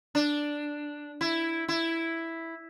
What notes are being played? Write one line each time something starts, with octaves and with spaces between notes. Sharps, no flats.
D4
E4
E4